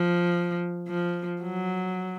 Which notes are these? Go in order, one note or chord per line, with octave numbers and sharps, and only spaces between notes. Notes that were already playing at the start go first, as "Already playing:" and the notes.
Already playing: F3
F3
F#3